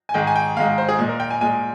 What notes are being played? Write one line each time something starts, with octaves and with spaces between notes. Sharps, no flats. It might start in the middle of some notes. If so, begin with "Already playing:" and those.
G#5
G#2 D#3 G#3 G5
G#5
G5
G#2 D#3 G#3 F5
C5
G#4
A#2 G#3
A#4
G5
G#5
A#2 G#3 G#5